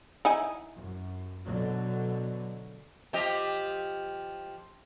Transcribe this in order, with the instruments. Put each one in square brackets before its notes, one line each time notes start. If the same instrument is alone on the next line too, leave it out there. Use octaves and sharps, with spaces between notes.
[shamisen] D#4 E4 G#5
[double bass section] F#2
B2 D3 F#3
[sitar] F3 G4 D#5